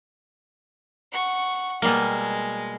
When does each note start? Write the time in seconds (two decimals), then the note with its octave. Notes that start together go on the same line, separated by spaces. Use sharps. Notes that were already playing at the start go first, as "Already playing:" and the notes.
1.12 F#5 C#6
1.82 B2 G3 G#3 A#3